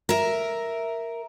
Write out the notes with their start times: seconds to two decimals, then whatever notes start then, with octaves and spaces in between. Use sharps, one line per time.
0.09 A#4 E5